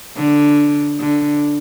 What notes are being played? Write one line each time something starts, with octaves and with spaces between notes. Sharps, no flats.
D3
D3